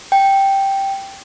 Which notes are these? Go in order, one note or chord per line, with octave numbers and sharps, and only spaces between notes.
G5